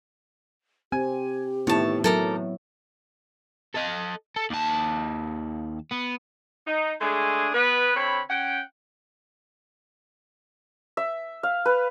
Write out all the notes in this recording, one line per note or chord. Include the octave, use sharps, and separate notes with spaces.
C4 G4 G#5
A2 D#3 B3 E4 C#5 A5
F#3 A4 A#4 D6
A4 D#5
A4
D#2 A5
B3
D#4
G#3 A3 D4 G#4
B3 B4
D3 C4 C#5 B5
C#4 F#5 G5
E5
F5
B4